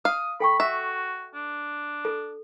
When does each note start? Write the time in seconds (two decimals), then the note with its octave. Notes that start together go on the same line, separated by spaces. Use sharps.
0.05 F5 D#6
0.40 A4 G5 B5 C#6
0.60 F#4 E5
1.35 D4
2.05 A4